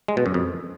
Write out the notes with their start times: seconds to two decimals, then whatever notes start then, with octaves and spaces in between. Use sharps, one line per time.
0.08 G#3
0.17 B2
0.26 F#2
0.34 F2